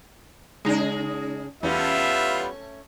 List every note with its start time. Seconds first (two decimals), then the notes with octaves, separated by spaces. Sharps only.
0.65 C#3 G#3 D#4 G#4
1.63 E2 G3 A3 B3 C#4 F4 E5